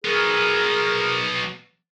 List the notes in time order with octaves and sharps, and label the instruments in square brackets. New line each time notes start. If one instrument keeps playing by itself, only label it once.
[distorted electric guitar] F#3 B3 [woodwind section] G#4 A#4